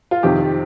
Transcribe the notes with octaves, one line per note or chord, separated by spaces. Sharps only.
F4
F2 C3 D#3 G4